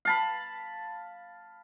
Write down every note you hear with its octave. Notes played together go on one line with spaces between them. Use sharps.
F5 A5 B5